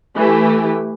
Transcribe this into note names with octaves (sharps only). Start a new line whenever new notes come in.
E3 A3 G4